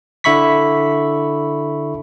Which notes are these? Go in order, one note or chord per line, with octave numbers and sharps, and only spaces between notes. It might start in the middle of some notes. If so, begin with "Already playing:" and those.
D3 E4 E5 B5 C#6 B6